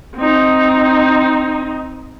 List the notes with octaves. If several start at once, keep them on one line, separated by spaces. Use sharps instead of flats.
C4 D#4